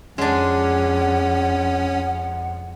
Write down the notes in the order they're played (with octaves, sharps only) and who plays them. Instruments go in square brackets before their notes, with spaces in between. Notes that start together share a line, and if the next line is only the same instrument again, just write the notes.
[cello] F2 [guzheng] G#3 D4 [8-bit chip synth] C#4 [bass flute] F#5